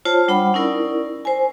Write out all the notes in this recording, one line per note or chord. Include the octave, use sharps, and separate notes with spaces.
F4 C5 C#5 A5
G3 D4 F#5 B5
C#4 D#4 E4 A#4 D5
C5 G#5